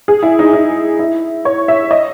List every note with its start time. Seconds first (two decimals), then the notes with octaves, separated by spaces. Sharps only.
0.08 G#4
0.23 E4
0.39 D#4
0.53 D#4
0.99 E4
1.45 C#5
1.68 E5
1.91 D#5